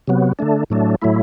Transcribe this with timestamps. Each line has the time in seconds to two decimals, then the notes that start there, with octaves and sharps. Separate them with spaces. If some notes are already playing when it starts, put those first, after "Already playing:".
0.08 C3 F#3 B3
0.39 D3 A3 D4
0.70 A2 F#3 A3 D4
1.02 A2 F#3 A3 E4